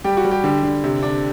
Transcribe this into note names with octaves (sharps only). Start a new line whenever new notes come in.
G3 G4
F#4
G3
G4
D3 G4
D3
C3
D4